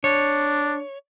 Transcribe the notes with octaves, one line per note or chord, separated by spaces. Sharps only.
D4 C#5